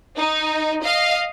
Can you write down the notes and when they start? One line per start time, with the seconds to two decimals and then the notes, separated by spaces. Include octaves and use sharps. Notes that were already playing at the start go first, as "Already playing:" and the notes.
0.17 D#4
0.84 D#5 F5